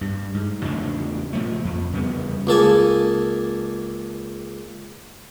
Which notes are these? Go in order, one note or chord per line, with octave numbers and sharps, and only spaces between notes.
G2
G#2
E2 C#3 A3 D4
A#2 F3 A3
F2
E2 C#3 G3 B3
C#2 A#3 A4 G#5